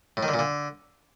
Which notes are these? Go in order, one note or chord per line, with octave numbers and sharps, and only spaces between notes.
A2
D#3
D3
A#2
D3